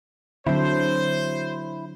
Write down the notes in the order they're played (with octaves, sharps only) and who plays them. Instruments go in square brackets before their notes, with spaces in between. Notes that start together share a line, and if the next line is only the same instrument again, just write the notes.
[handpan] D3 F#3 [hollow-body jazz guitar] C4 D4 E4 [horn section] C5